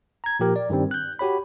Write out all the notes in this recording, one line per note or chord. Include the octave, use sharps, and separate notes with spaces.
A#5 G#6
A#2 F3 G4 A#4
D5
G2 D#3 G3 C4
F#6 G6
F#4 G4 C#5 B5